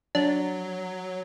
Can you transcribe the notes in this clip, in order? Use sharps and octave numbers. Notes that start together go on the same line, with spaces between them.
F#3 D4